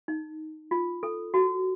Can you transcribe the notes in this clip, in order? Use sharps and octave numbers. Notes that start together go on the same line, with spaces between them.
D#4
F4
A4
F#4